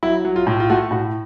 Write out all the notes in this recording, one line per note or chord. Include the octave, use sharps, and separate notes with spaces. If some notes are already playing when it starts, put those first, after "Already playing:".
F#3 E4
F#3
F4
A2
F4
A3 F#4
A2 F#4